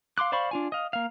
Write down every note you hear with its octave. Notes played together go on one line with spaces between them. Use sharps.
F5 C6 D6 F#6
C5 D5 F5 B5 C#6
D4 F4 G#5
D#5 F5
A#3 F5